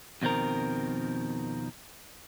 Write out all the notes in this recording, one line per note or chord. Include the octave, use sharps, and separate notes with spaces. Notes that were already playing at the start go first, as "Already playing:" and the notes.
F2 B2 D#3 C4 A#4